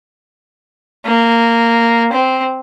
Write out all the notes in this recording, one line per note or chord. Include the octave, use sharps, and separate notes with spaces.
A#3
C4